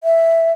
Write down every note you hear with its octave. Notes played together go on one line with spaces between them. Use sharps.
E5